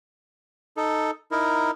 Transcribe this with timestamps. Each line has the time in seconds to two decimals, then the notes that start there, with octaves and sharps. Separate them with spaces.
0.77 D#4 A4
1.31 D#4 E4 A#4